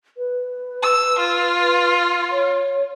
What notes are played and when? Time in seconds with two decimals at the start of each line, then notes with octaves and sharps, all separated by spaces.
0.17 B4
0.83 E6
1.19 F4
2.32 C#5